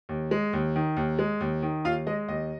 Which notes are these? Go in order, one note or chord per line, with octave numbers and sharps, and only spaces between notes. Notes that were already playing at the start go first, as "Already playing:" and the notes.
D#2
G#3
D#2
D#3
D#2
G#3
D#2
D#3
D#2 F4 F5
G#3 D#5
D#2 D#5